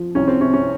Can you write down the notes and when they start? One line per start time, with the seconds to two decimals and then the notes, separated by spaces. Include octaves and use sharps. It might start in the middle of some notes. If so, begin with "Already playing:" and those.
Already playing: F3
0.15 C2 C#4
0.28 C4
0.41 C3 C#4
0.53 C#4